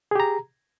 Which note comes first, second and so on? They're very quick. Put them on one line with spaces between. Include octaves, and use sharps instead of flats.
G#4 G4 A#5